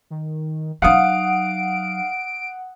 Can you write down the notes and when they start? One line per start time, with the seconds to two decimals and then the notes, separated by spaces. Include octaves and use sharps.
0.10 D#3
0.82 F#3 D#4 F5 F#5 D#6 D7